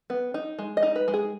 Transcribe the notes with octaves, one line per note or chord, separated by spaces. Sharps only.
B3
D#4
G#3
D#5
D#4
B4
G#3
G#4